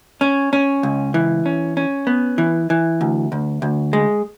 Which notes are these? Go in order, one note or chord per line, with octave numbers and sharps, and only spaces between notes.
C#4
C#4
C#2
E3
C#4
C#4
B3
E3
E3
D2
D2
D2
G#3